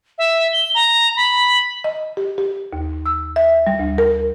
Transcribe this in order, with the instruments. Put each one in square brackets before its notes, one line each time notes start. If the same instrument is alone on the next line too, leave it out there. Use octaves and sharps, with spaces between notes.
[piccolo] E5
G7
A#5
B5
[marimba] D#5
G4
G4
D#2
E6
E5
G3
D2
A#4